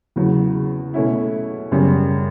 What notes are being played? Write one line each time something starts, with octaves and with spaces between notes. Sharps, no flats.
E2 C#3 F#3
B2 A3 C#4 E4
F#2 C#3 G3 C#4